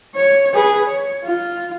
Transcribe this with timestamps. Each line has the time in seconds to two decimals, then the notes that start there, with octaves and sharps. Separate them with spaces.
0.16 C#5
0.54 G#4 B4
0.87 C#5
1.24 F4